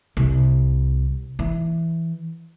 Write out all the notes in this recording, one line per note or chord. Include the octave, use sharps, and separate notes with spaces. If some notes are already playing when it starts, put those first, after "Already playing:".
C2
E3